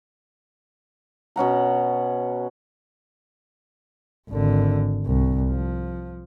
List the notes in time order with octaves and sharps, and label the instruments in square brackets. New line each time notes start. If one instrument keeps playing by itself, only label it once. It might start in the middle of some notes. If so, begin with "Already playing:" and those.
[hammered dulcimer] B2 C#4 F#5 A#5
[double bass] G#1 D3
C2
F3